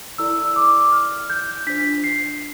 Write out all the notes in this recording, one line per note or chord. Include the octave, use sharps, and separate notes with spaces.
E4 A4 D5 E6
D6
F6
G6
D4 F4 C5 B6
C7